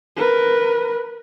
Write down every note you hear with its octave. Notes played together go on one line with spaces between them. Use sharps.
A#4 B4